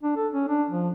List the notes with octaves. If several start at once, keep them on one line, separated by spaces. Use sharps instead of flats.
D4
A4
C#4
D4
F3